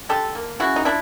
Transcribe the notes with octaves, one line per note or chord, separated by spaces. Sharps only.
D3 G4 A4
A#3
C#3 E4 F#4
D#4
F3 D4 E4